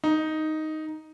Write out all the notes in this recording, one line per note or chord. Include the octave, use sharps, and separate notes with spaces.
D#4